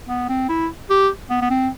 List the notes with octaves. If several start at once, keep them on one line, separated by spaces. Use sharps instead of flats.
B3
C4
E4
G4
B3
B3
C4